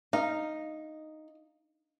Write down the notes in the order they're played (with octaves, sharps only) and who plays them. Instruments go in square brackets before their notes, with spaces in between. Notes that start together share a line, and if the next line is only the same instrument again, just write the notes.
[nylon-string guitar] D#4 [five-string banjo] F5